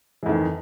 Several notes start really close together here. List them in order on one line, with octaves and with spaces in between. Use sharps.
E3 F2 D#3